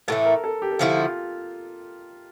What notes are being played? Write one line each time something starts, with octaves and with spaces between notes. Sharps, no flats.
A2 E3 A3 A4
A#4
A4
G4
A4
D3 F3 A3 E4 G4
F4